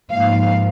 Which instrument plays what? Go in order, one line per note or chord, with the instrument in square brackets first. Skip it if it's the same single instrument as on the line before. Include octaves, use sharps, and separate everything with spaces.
[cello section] G#2 F3 A#3 F5